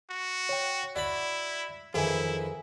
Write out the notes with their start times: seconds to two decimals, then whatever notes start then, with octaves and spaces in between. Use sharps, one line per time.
0.10 F#4
0.49 C#5 G5
0.96 E4 F#4 D5 A5 B5
1.94 F2 D#3 E3 E4 G#4 G#5